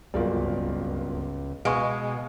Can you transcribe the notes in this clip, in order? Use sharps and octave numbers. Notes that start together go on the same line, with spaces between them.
D1 G1 C#2 F4 A#4 D5
B2 G#3 B3 F5 G#5 C#6 D7